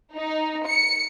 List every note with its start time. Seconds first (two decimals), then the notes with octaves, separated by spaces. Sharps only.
0.14 D#4
0.67 C#7